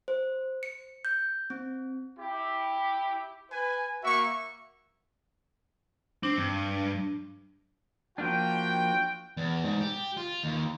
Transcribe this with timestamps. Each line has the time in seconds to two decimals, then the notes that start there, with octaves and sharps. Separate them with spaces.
0.08 C5
0.63 C#7
1.05 G6
1.50 C4
2.19 E4 G4
3.51 B4 G#5
4.03 A#3 F#4 E5 C#6
6.23 C4 D4
6.37 G2
8.18 F3 A#3 D4 F#4 G5
9.37 E2
9.64 G#2
9.80 G4
10.17 F4
10.44 D#2